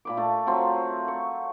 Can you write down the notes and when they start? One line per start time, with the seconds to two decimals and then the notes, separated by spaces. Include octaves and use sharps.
0.05 A#2 B5 D6
0.17 A3 A4 A5
0.47 F#3 A3 C4 F4
1.08 C#6